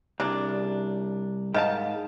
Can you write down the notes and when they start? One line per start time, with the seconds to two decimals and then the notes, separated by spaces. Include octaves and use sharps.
0.20 C2 C#3 D4
1.54 G#2 D#3 F5 A5